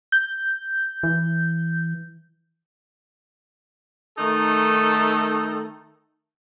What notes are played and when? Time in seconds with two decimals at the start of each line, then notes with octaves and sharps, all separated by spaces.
0.12 G6
1.03 E3
4.18 D#3 A3 D#4 A4